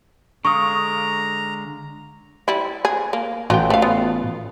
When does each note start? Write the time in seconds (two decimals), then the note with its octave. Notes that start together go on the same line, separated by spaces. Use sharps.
0.45 D3 G#3 F5 A#5 C#6 D#6
2.48 G3 E4
2.85 G#4
3.13 A#3
3.50 A1 F#3 F4 G5
3.70 A3 F5
3.82 B3 F4